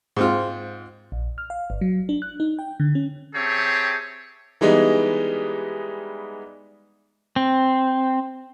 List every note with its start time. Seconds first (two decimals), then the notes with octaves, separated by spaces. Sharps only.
0.16 G#2 C4 F4
1.12 A#1
1.38 F6
1.50 F5
1.70 G1
1.81 F#3
2.09 D4
2.22 F#6
2.40 D#4
2.59 G5
2.80 D3
2.95 C#4
3.34 C4 G4 G#4 C#5 E5 A5
4.61 E3 G3 G#3 B3 D#4
7.36 C4